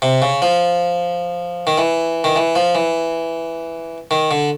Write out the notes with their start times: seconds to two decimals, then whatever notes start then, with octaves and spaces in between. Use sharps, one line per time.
0.02 C3
0.22 C#3
0.42 F3
1.67 D#3
1.78 E3
2.24 D#3
2.36 E3
2.56 F3
2.75 E3
4.11 D#3
4.31 D3